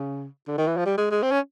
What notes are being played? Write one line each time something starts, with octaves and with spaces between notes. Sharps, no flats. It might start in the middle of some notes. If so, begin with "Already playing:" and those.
Already playing: C#3
D3
D#3
E3
F3
G3
G#3
G#3
C4
C#4